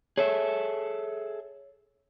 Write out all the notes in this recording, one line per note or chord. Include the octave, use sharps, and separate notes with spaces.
G#4 A4 C#5 E5